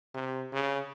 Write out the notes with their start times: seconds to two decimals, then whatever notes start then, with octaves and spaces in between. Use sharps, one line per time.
0.14 C3
0.53 C#3